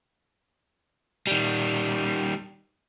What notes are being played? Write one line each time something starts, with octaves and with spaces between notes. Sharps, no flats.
D#3 G3